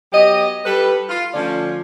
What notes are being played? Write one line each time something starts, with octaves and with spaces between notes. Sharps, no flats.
F#3 B3 G4 D#5
G3 G4 A4 B4
F4
D3 F3 A3 C#4 F4 D5